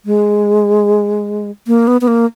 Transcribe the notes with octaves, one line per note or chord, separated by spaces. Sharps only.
G#3
A#3
B3
B3
A#3